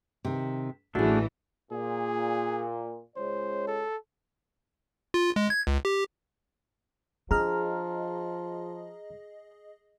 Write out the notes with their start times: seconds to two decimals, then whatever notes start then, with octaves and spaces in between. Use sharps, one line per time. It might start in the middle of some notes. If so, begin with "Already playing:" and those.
0.25 C3 D#3
0.95 A1 E3 A3 D4 F#4 G#4
1.72 A#2 G#4
3.16 C#2 G#3 C5 C#5
3.67 A4
5.14 F4
5.36 G#3
5.50 G#6
5.67 C#2
5.85 G4
7.31 F3 D4 G#4 D#5 A#5 F6